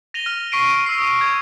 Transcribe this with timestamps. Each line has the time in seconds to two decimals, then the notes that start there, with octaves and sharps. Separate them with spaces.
0.14 A#6 D#7 F7 G7
0.26 F6
0.52 C#6 B6 C7 D7 D#7
0.86 E6 C7
0.98 D#6
1.17 G#6 D#7